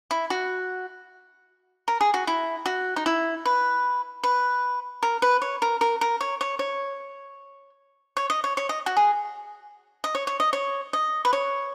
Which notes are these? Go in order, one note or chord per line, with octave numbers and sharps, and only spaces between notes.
E4
F#4
A#4
G#4
F#4
E4
F#4
D#4
E4
B4
B4
A#4
B4
C#5
A#4
A#4
A#4
C#5
C#5
C#5
C#5
D#5
C#5
C#5
D#5
F#4
G#4
D#5
C#5
C#5
D#5
C#5
D#5
B4
C#5